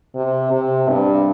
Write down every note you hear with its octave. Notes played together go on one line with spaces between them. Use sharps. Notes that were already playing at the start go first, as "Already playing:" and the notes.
C3
C3
G2